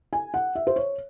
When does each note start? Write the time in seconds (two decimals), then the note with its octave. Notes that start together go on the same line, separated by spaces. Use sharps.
0.13 G#5
0.34 F#5
0.55 E5
0.67 C5
0.76 C#5